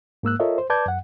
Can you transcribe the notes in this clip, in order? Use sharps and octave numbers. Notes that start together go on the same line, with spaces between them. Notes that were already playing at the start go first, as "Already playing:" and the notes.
G#2 A#3 E6 F#6
F4 A4 A#4 C#5 D#5 E5
C5
B4 D5 A5 D6 G6 G#6
F#2 F#5